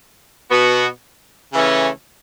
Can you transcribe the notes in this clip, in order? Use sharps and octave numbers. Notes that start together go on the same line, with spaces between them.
B2 B3 F#4
C#3 E3 A3 C#4